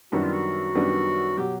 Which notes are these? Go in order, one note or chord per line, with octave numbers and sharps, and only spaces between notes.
F#2 D#3 G3 B3 D4 F#4
F4
F#4
F#2 D#3 G3 B3 D4
B2 F#3 G4